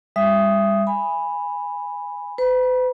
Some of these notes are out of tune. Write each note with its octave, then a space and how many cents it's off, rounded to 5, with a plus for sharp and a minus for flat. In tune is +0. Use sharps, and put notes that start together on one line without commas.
G3 +35 E5 +25 D#6 +0
G#5 -15 B5 +0
B4 +45 B5 -40